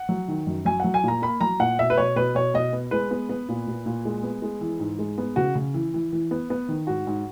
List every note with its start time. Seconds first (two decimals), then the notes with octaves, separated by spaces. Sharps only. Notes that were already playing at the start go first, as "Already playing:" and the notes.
Already playing: F#5
0.09 F#3
0.28 D#3
0.47 F#2
0.65 F#3 G#5
0.80 F#3 F#5
0.94 G#5
1.03 A#2 A#5
1.22 A#3 B5
1.41 F#3 A#5
1.59 A#2 F#5
1.79 B2 E5
1.90 B4
1.98 B2 C#5
2.16 B2 B4
2.35 B2 C#5
2.54 B2 D#5
2.73 B3
2.91 G#3 B4
3.11 B3
3.29 B3
3.49 A#2
3.67 A#2
3.86 A#2
4.05 G#3
4.23 B3
4.42 G#3
4.61 E3
4.80 G#2
4.99 G#3
5.18 B3
5.36 C#3 F#4
5.55 C#3
5.74 E3
5.94 E3
6.12 E3
6.31 B3
6.50 B3
6.68 D#3
6.87 G#2 F#4
7.07 G#2